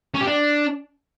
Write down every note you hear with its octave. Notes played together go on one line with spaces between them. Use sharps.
C#4
G4
D4